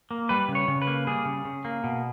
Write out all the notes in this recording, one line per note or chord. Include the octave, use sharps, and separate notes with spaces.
A#3
G3 B4
C#3
C#5
C#3
B4
A#3
G3 G#4
C#3
C#3
A#3
B2